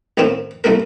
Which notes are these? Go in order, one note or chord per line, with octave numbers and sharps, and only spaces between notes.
A1 A2 D#3 C4 C#4
C2 A3 A#3 A#4